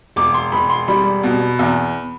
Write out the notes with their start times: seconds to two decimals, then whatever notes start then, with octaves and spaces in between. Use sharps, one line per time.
0.16 E1 D6
0.34 C6
0.52 E1 B5
0.70 C6
0.88 G3 B5
1.23 B2
1.59 E2